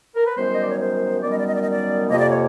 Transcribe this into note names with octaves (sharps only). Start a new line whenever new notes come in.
A#4
B4
F#2 D#3 G3 B3 C5
D#5
D5
C#5
C5
F#2 D#3 G3 B3 D5
D#5
D5
D#5
D5
D#5
D5
F2 C3 F3 A#3 D#5
D5
C#5